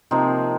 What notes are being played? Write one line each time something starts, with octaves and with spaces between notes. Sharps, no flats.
C3 F3 A#3 C4 D#4